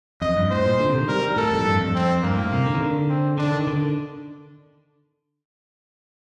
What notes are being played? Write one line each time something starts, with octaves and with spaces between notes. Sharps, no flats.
F2 D#5
G2
A2 C5
A#2
D3
C3
D#3
G3 A#4
G3
A2 A4
F2
G2
F2
C4
G2 A#3
A2
C3
D3
D#3
D3
C4
D3 D4
D#3
D3